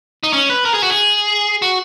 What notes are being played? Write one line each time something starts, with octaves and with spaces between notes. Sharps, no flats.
D#4
C#4
B4
A#4
G#4
F#4
G#4
F#4